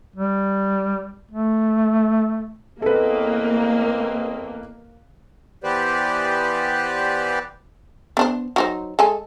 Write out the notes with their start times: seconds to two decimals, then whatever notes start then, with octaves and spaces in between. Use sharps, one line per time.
0.16 G3
1.31 A3
2.82 E2 A#3 C4 A4 B4 D#5
5.64 E3 B3 G4 B4 C5 D5
8.17 B3 D4 C5
8.56 F#3 D#4 C5
8.99 G#3 A4 G#5